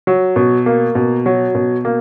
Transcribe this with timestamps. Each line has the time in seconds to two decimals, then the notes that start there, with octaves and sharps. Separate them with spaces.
0.07 F#3
0.36 B2
0.66 A#3
0.95 B2
1.26 F#3
1.55 B2
1.85 A#3